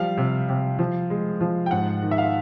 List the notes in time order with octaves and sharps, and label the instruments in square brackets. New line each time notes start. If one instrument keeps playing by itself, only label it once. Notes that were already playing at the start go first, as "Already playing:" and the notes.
Already playing: [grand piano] F3 G3 F5
C3
C3
F3
G#3
F3
G5
G#2 F#5
D#3
E5
F5